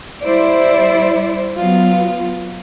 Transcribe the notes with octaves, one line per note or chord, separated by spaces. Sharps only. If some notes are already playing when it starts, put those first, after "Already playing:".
G3 E4 C5 D5
F#3 B3 F4